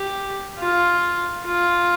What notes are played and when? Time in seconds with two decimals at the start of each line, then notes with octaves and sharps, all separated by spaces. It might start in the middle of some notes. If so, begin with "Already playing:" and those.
Already playing: G4
0.59 F4
1.45 F4